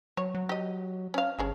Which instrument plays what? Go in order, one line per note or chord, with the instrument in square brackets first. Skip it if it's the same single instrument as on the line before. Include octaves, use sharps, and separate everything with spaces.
[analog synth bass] F#3 [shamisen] C#5
[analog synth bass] F#3
[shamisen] G4 D#5
C#4 F5
[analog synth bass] G1 [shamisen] C#4 G#4 A4